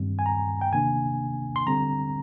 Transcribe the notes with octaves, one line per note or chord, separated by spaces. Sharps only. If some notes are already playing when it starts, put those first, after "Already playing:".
Already playing: G2 D#3 G3 C4
G#5
A#5
G5
C3 D#3 A#3 D4 G#5
C6
D3 G3 C4 A#5